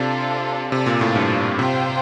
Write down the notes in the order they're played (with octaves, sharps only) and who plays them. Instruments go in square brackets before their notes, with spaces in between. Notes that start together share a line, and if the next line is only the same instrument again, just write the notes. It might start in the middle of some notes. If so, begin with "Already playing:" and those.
Already playing: [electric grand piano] C3 [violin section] D4 F4 A4 D5
[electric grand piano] C3 [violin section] F4 A4 D5
[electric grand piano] A#2
A2
G2
[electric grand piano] C3 [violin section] F4 C5 G5